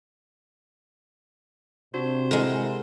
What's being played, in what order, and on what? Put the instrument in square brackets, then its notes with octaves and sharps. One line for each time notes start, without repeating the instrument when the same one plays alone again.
[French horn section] C3 [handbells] D4 F#4 [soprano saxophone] C5
[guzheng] G#3 A#4 [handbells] E4 A4 F#5